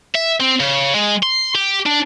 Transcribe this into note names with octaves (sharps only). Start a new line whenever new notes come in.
E5
C4
C#3
G#3
C6
G4
D4